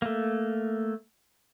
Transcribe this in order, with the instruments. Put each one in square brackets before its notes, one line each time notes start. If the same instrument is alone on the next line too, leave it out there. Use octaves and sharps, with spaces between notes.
[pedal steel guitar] A3 A#3